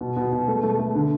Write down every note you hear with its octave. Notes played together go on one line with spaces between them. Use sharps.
B2
B2
B2
A3
A3
A3
D3